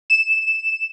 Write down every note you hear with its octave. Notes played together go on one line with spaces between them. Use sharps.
E7